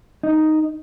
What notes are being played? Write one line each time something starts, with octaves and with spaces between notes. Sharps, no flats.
D#4